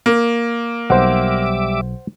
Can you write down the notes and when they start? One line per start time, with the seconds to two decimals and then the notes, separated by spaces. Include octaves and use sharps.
0.06 A#3
0.90 B1 G3 C5 E5 F#5 D6